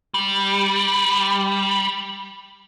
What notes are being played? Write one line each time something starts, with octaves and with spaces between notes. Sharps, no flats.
G3